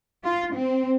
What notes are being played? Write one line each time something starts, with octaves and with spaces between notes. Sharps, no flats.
F4
C4